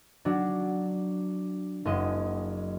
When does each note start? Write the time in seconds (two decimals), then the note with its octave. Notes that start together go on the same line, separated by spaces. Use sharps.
0.25 F#3 D4
1.85 F#1 G#3 D#5